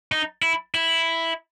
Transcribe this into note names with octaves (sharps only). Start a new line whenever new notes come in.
D#4
E4
E4